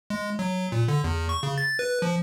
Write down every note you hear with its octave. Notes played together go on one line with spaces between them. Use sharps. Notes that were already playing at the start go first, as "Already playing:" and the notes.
G#3
F#3
A#2
D3
E2
C#6
C#3
A6
B4
F3